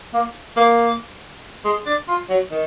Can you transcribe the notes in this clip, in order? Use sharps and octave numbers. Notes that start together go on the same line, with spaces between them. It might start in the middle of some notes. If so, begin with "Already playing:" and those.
A#3
A#3
G#3
D4
F4
F#3
D#3